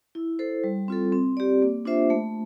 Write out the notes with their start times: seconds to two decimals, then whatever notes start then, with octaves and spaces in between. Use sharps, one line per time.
0.15 E4
0.39 A4 C5
0.64 G3
0.88 C4 F4 A4
1.12 C4
1.37 G4 D5
1.62 A#3
1.85 D4 F4 C5 E5
2.10 A3